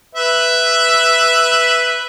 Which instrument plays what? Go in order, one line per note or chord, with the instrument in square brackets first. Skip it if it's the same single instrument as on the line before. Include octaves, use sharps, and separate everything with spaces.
[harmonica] B4 E5